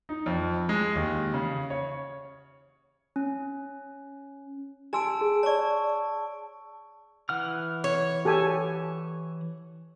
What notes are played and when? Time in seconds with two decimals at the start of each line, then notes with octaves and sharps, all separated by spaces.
0.09 D#4
0.26 F2
0.69 G#3
0.95 D#2
1.34 C#3
1.70 C#5
3.16 C#4
4.93 G4 G#5 A5 C6 E6 D7
5.21 G#4
5.43 C#5 D5 A5 C#6
7.29 E3 F#5 F6
7.84 C#5
8.25 G4 A4 G#5